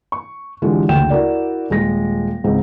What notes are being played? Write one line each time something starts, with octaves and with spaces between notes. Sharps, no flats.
C#6
D3 E3 G#3 F4 G4 A4
F#1 D2 G5 E7
E4 F#4 A#4 D5
D#1 G#3 A#6
C#2 G#2 C4